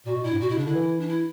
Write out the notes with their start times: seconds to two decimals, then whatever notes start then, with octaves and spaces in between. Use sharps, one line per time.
0.06 A#2 F#4
0.14 B2
0.23 A#2 E4
0.31 G2
0.40 A#2 F#4
0.49 B2 E4
0.57 C#3 D4
0.66 D3 E4
0.75 E3
1.00 D4
1.08 E4